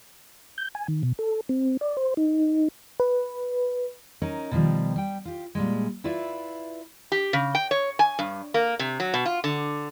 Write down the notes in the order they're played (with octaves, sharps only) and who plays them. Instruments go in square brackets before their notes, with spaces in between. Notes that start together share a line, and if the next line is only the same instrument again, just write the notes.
[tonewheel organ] G6
G#5
D#3
B2
A4
C4
D5
C5
D#4
[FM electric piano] B4
[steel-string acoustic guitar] C#4 D#4 A#4
B2 D#3 F3 G3
G3 G5
F4 G4
A#2 G3 G#3
E4 F4 B4 D5 E5
[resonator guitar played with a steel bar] G4
C#3
G5
C#5
G#5
G2
A#3
C3
F#3
B2
F4
D3